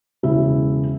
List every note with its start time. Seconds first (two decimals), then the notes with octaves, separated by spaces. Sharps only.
0.23 E1 C#3 E4 E5